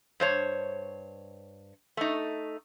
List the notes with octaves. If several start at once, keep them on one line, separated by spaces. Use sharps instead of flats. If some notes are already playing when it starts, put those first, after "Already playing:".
G2 C5 C#5
A3 D#4